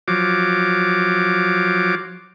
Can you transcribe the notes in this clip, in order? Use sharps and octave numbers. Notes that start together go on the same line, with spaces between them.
F3 F#3 D6